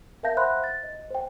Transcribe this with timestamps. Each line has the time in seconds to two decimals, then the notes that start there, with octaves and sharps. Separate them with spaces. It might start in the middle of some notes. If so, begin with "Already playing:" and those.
0.23 A#4 E5 F5 A5 G6 A#6
0.37 C5 E5 F#5 B5 C6 F#6
0.64 A6
0.83 D#5
1.10 C5 G5